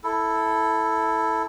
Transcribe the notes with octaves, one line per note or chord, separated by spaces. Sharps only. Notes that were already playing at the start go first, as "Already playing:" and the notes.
E4 A4